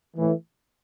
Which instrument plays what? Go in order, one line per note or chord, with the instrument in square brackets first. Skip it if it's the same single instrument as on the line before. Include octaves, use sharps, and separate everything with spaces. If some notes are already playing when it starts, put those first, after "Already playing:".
[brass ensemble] A2 E3